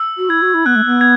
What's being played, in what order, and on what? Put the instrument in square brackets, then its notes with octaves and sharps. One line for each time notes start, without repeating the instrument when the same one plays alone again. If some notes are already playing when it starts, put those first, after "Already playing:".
Already playing: [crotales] E6
[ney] F#4
[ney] E4 [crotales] G#6
[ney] F#4
E4
[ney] B3 [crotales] F#6
[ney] A3
B3
[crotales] G#6